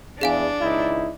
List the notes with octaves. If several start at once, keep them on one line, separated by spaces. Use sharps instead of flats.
E2 D4 G#4 F5 G#5
C#2 D#4 E4